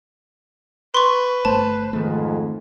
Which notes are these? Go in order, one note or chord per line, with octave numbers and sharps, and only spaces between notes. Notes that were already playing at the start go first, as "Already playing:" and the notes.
B4 C6 C#6
G1 A3 C5 A5
F2 G#2 D#3 A3